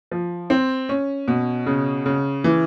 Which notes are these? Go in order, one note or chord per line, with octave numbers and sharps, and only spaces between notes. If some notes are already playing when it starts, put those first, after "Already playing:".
F3
C4
C#4
B2
C#3
C#3
E3